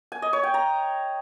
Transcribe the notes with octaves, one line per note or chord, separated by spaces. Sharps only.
G#5
D#5
C#5
G5
A#5